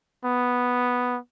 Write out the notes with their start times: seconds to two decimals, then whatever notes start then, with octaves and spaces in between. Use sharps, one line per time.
0.24 B3